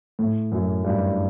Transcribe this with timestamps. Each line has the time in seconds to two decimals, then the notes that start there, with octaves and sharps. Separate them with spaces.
0.19 A2
0.52 F#2
0.84 G2